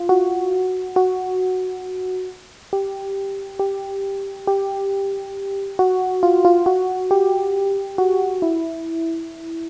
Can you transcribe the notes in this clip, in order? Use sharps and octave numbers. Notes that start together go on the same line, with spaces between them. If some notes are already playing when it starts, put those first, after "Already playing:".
Already playing: F4
F#4
F#4
G4
G4
G4
F#4
F4
F4
F#4
G4
F#4
E4